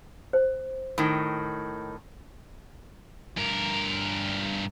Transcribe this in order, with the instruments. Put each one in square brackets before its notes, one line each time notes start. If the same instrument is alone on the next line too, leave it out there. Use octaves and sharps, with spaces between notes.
[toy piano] C5
[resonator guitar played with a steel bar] A2 D#3
[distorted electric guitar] G2 A#4